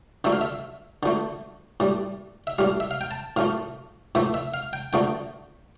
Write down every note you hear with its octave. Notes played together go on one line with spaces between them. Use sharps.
D3 F3 A3 E5
F5
E5
D3 F3 A3
A2 G3
E5
A2 G3 F5
E5
F5
G5
A5
A2 F3 A3 F5
A2 F3 A3 E5
E5
F5
G5
D3 F3 A3 G5